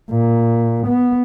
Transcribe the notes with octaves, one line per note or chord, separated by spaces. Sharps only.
A#2
B3